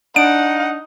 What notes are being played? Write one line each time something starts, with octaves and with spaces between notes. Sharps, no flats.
D4 D#4 F#5 D7